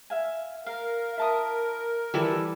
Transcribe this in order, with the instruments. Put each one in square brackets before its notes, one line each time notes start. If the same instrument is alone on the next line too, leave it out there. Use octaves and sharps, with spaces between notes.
[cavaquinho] E5 F5 G#5
[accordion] A#4 [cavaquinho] F5
[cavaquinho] E4 A5 D#6
[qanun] E3 G3 A4 [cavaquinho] D6